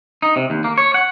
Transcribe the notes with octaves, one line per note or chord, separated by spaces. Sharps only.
D#4
C3
D#2
A#3
C#5
F#5